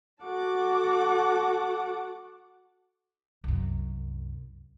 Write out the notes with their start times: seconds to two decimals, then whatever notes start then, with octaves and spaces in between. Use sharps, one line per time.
0.23 F#4 A4 F#5 A5 D6
3.44 C2 F#2